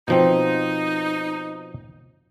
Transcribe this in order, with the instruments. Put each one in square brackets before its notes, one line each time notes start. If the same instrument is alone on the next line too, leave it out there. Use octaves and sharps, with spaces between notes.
[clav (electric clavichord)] B2 F3 C4 [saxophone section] D#4